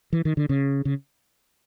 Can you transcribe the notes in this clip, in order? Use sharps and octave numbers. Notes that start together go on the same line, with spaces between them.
E3
D#3
D3
C#3
C#3